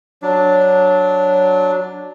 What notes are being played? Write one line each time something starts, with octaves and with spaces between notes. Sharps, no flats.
F#3 D4